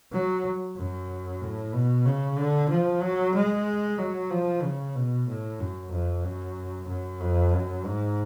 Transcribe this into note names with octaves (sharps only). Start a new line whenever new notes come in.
F#3
F#2
A2
B2
C#3
D3
F3
F#3
G#3
F#3
F3
C#3
B2
A2
F#2
F2
F#2
F#2
F2
F#2
G#2